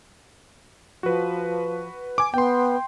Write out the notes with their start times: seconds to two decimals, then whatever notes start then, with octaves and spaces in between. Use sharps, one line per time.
1.03 F3 F#4 B4
2.18 G#5 D6
2.34 B3 G5 C6